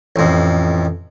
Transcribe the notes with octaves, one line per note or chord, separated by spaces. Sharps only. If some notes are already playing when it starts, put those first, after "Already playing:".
A1 F2